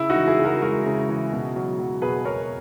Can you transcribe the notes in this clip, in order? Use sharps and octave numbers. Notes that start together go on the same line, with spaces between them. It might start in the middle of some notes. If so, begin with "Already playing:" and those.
Already playing: C#3 E4
D#4 F#4
E3
E4 G#4
C#3
F#4 A#4
G#3 F#4 A#4
C#3
E3
B2
F#3
F#3
B2 G#4 B4
B2 A#4 C#5